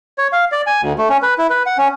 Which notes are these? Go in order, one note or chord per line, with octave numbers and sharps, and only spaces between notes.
C#5
F5
D5
G#5
D2
A3
C#4
B4
E4
B4
F#5
C#4